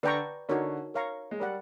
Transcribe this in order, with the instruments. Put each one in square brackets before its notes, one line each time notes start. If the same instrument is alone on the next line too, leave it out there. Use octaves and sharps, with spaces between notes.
[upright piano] D3 [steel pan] B4 D5 G5 A#5 C#6
[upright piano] D3 [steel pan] D#4 F#4 A#4 C#5
[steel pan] A#4 C#5 F5 A#5 C#6
[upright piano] G#3
[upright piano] G3 [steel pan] A#4 D5 F#5